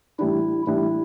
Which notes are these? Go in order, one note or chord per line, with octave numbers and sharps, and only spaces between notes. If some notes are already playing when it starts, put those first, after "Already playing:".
A2 E3 G3 D4 E4
A2 E3 G3 D4 E4